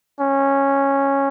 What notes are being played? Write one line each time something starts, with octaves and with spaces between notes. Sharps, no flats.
C#4